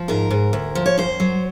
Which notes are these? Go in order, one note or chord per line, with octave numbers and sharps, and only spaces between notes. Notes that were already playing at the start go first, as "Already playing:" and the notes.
Already playing: F3
G#2 A#4
G#2
D2
F3
C#5
F#2 C5
F#3